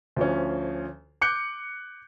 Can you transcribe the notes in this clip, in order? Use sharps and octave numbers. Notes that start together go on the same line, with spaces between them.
D2 F3 C#4
D6 F#6 G6 C#7